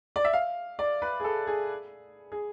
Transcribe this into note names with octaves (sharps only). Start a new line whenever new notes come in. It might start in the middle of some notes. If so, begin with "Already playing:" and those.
D5
E5
F5
D5
B4
G#4
A4
G#4
G#4